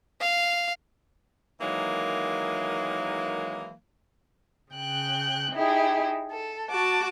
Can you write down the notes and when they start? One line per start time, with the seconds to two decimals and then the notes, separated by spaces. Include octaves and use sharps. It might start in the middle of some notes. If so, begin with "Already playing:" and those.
0.21 F5
1.60 D#3 E3 F#3 G#3 A#3
4.72 C#3 G5 F#6
5.53 D#4 E4 G4 G#4
6.30 A4
6.70 F#4 A5 D6